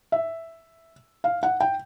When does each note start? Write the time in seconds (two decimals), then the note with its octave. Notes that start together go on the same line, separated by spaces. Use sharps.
0.12 E5
1.24 F5
1.43 F#5
1.61 G5